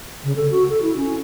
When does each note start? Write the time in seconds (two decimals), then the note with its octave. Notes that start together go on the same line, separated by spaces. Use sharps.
0.24 C#3
0.36 A4
0.51 F#4
0.69 A4
0.82 E4
0.97 C#4